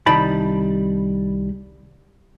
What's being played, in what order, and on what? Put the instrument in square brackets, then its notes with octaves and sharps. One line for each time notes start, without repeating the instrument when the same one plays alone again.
[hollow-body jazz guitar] C2 D#3 G3 G4 A5 B5